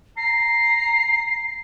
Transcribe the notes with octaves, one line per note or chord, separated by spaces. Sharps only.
A#5 C7